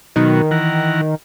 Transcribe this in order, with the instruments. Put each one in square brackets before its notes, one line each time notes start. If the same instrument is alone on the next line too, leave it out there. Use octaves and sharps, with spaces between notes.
[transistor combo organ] B2 F#3 [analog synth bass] D#3
[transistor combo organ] E3 A#4 F#5